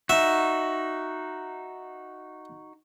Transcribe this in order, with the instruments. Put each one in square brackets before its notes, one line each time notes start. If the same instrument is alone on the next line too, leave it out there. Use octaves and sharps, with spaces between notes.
[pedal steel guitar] D#4 F#4 [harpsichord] E5